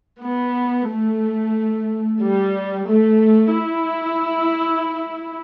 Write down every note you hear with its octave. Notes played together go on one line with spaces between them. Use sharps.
B3
A3
G3
A3
E4